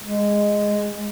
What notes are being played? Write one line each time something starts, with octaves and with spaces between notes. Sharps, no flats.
G#3